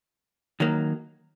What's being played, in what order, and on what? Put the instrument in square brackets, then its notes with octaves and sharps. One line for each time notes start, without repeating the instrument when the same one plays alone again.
[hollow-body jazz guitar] D#3 F#3 A#3